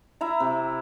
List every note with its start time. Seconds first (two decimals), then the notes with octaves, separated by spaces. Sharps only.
0.21 E4 E5 A#5
0.40 C3